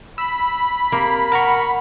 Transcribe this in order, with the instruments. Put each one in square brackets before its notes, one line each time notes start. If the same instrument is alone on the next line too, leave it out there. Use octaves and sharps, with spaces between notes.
[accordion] B5 [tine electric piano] E6
[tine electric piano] C3 [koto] A#3
[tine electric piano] A#4 A#5 C#6 [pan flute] F#5